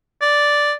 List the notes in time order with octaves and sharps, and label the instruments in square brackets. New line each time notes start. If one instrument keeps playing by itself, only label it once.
[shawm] D5